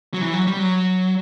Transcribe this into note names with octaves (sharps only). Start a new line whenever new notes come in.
F#3
E3
F#3
G3
F#3